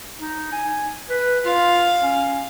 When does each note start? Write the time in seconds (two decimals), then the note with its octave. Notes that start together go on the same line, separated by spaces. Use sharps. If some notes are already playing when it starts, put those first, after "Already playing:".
0.19 D#4
0.52 G#5
1.10 B4
1.45 F4 F5
2.01 C#4